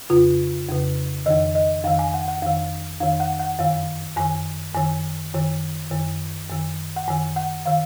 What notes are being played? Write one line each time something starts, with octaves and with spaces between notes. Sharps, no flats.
F2 C#3 F4
F2 C#3
F2 D#3 D#5
D#5
F2 D#3 F5
G#5
F#5
F#5
F2 D#3 F5
F2 D#3 F5
F#5
F#5
F#2 D#3 F5
F#2 D#3 G#5
F#2 D#3 G#5
F#2 D#3
F#2 D#3
F#2 D#3
F#5
F#2 D#3 G#5
F#5
D#3 F5